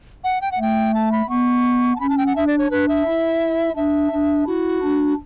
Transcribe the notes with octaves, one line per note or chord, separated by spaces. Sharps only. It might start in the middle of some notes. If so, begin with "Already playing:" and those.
F#5
G5
F#5
A3 G5
A5
B5
B3 C#6
A5
C#4 B5
A5
G5
F#5
D4 E5
D5
C#5
D4 B4
E5
E4
D4 E5
D4
E4 F#4
D4